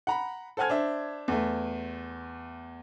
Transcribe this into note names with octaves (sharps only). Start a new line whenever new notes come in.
F#5 A#5 B5
A4 C5 F#5 G#5 F6 G#6
D4 C5 E5
E2 A3